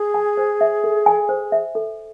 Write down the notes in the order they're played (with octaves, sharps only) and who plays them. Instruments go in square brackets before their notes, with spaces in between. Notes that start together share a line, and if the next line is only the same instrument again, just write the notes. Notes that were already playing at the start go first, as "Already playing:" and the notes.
Already playing: [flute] G#4
[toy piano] G#5
C5
E5
A4
G#5
C5
E5
A4